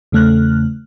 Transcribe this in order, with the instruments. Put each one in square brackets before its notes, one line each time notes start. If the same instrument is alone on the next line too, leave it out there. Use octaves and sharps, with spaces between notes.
[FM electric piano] E2 C#3 A3 F6 F#6